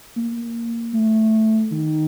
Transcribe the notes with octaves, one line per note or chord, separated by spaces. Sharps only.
A#3
A3
D#3